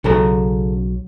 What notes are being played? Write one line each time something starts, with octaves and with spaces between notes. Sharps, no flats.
B1 C#3 F#3 A4 A#5